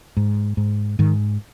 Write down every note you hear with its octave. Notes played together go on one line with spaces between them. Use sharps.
G#2
G#2
G#2 D#3